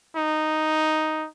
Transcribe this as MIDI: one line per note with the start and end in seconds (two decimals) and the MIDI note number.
0.16 1.28 63